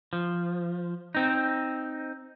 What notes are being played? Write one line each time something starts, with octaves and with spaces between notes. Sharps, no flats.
F3
C4 D#4